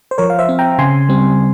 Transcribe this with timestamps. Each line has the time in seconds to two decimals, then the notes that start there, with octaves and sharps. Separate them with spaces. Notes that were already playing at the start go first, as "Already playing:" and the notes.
0.11 C5
0.18 F3 A#4 C#5
0.30 F5
0.39 C5 E5
0.49 C4
0.59 G5 A#5
0.78 C#3 G#5 C6
1.09 G3 C4